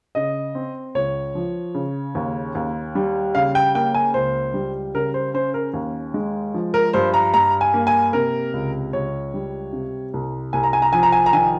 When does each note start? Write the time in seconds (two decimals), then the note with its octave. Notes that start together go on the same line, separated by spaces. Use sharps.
0.15 C#3 D#5
0.55 C4
0.95 C#2 C#5
1.35 F3
1.75 C#3
2.15 D#2
2.55 D#2
2.95 G3
3.35 C#3 F5
3.55 G5
3.75 A#3 G5
3.94 G#5
4.14 C#2 C5
4.54 G3
4.95 C#3 A#4
5.14 C5
5.34 C#4 C5
5.54 A#4
5.74 D#2
6.14 G#3
6.54 F3
6.74 A#4
6.93 G2 C5
7.14 A#5
7.34 G2 A#5
7.61 G#5
7.74 A#3
7.87 G#5
8.13 C3 A#4
8.53 C#2
8.93 C#2 C#5
9.34 G3
9.73 C3
10.14 C2
10.53 C2 G#5
10.63 A#5
10.73 G#5
10.82 A#5
10.93 F3 G#5
11.03 A#5
11.12 G#5
11.26 A#5
11.33 D#3 G#5